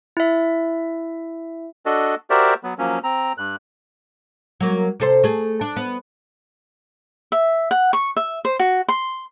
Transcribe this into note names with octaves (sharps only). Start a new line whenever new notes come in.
E4 E5
D4 F#4 A4 D#5
F#4 G4 A#4 C5 D5 E5
F#3 B3
F3 F#3 A#3 C#4
C4 A#5
G2 F#6
F#3 A#3
C3 A4 C5
A3 G#4
D4
B3
E5
F#5
C#6
E5
C5
F#4
C6